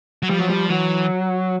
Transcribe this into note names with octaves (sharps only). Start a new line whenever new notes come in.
F#3
F3 G3
F#3
G3
E3 F#3